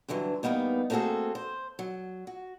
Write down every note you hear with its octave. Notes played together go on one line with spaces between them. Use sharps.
G2 D3 E3 F#3
E2 G3 A#3 B3 D#4
A3 A#3 C4 F#4 G#4 A4
C5
F#3
F#4